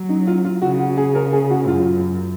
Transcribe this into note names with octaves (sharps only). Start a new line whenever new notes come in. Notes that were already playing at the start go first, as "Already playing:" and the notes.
Already playing: F#3
D#4
F4
F4
C#3 F#4
F#4
G#4
A#4
G#4
F#4
F#2 F4